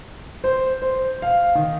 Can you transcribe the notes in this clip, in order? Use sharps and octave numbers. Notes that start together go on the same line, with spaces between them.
C5
C5
F5
D#3